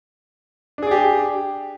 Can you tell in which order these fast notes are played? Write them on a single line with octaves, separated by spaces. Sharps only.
D4 G#4 D5 G4